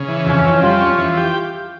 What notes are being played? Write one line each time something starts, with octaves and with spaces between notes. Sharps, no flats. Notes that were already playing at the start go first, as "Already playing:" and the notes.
Already playing: C#3
E3
F2 C#4
F2
G3 F4
C#4
E3
G4